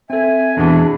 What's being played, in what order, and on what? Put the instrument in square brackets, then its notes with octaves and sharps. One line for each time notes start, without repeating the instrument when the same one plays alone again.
[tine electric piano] C4 A4 [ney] E5 [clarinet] G#5
[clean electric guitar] E2 B2 E3 [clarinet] D4 [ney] G#4